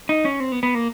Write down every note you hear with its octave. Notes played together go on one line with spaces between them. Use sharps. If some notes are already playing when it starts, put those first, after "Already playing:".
D#4
C#4
C4
B3
B3
A#3